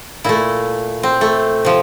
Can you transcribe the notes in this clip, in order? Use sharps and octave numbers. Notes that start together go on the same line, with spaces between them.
A#2 A3 E4
C4
A3
C3 F3